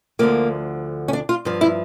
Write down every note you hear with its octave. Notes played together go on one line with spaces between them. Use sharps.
D2 D3 F3 A#3
C#4
D4
F4
G2 F3
E4